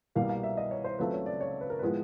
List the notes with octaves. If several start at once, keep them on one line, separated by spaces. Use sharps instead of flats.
C2 B2 G3 A#3 F5
F5
E5
D#5
C#5
C5
C#2 C#3 F#3 A3 C4 B4
C#5
D5
C#5
B4
A#4
A2 F3 G#3 B3 B4